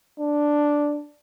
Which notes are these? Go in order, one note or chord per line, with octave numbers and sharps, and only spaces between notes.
D4